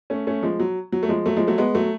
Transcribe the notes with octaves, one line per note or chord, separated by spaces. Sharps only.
A3 C#4
A3 C#4
F3 G#3
F#3
F#3
A3
F3 G#3
F#3 A3
F3 G#3
F#3 A3
G#3 B3
F#3 A3